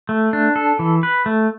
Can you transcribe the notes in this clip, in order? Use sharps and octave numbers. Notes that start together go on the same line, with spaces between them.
A3
D4
A4
E3
B4
A3